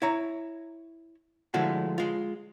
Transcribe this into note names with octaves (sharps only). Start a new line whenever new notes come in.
E4 C#5 A#5
D3 F3 G#3 A3 E4 F#4
G#3 F4